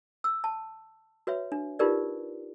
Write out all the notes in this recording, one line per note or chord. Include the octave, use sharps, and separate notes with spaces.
E6
A5
F#4 B4 C#5 E5
D4
D#4 F4 G4 A#4 B4 D5